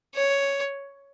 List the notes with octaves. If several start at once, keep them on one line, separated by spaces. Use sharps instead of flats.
C#5